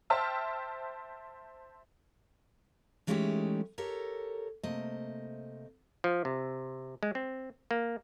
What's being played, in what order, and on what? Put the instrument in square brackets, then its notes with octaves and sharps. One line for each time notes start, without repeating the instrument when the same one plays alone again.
[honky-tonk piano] C5 E5 G5 A5 E6 F6
[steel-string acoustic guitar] E3 G#3 A3 C#4 D#4 G4
G4 A4 A#4 C#5
C3 A3 A#3 C5 D#5
[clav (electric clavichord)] F3
C3
G#3
C4
A#3